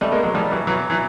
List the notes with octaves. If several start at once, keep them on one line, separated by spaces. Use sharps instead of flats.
G3 A3
G#3 A#3
F#3 G#3
F3 G3
E3 F#3
E3 F#3
E3 F#3